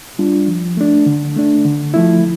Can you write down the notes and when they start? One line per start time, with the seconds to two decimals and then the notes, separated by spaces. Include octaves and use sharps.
0.19 G3 D4 F4
0.48 F3
0.77 A3 D4
1.06 D3
1.36 A3 D4
1.65 D3
1.94 F3 A3 E4